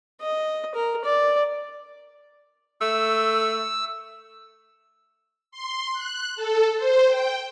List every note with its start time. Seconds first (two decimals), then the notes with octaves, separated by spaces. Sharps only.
0.22 D#5
0.75 A#4
1.05 D5
2.81 A3 E6
5.51 C6
5.93 F#6
6.36 A4
6.77 C5
7.08 G5